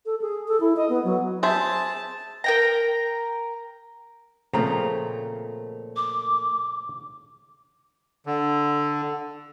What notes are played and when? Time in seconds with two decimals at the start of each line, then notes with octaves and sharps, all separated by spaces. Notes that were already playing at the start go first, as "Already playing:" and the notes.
0.06 A4
0.21 G#4
0.48 A4
0.60 E4
0.76 D#5
0.89 B3
1.04 F#3
1.43 G#4 C5 E5 A5
2.44 A#4 G5 A#5
4.53 A#2 C#3 F3 A3 C4 A#5
5.96 D6
8.26 D3